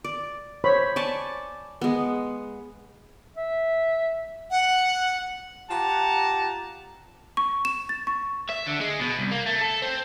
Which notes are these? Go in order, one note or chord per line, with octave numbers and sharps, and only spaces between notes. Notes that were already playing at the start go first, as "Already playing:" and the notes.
D5
C5 C#5 B5
D5 G#5 A5 C#6
G#3 B3
E5
F#5
F4 G4 F#5 A5 A#5
C#6
E7
A6
C#6
E5
D3
G#3
B2
C2
A#3
A3
A4
C4